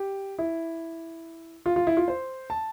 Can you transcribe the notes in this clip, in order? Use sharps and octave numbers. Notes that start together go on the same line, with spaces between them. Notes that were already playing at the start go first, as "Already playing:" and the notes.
Already playing: G4
E4
F4
F4
E4
F4
C5
A5